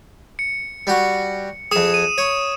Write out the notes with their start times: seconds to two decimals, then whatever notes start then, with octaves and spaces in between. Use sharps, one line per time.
0.39 C#7
0.87 G3 F#4
1.71 F2 G#4 D#6 E7
1.94 D#7
2.18 C#5